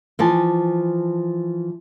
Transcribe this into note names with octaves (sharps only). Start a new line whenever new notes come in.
E3 F3 G#5 A5